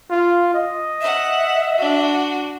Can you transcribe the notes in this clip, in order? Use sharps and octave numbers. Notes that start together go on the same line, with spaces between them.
F4
D#5
E5 F#5 E7
D4 F#4